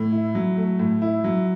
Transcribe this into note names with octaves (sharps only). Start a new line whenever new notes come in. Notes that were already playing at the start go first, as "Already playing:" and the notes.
Already playing: A2
E4
F#3
A3
A2
E4
F#3